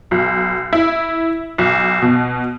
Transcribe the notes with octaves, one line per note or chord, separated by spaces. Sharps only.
B1
E4
B1
B2